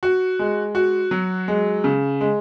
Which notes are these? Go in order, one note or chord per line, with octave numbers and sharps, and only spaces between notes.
F#4
G#3
F#4
F#3
G#3
C#3
G#3